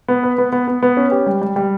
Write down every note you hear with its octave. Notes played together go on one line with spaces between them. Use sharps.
B3
B4
B3
B3
B3
B3
C#4
G4
G3
G3
G3